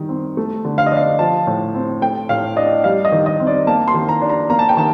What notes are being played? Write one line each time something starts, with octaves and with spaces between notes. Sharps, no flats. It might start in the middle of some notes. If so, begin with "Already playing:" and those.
Already playing: D#3 G3
C4
A3
D3
F5
D#5
D4 F5
F3 A5
A2
C4
A3 G5
A2 F5
D4 D#5
G3 F5
D#5
D#3
D#5
C4
D5
A#3 A5
C6
D#3
A#5
D4
A#5
A#3 A#5
A5
G5
D#3 A5